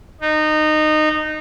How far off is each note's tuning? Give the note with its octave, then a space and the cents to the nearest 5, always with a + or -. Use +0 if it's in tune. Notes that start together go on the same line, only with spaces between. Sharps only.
D#4 -20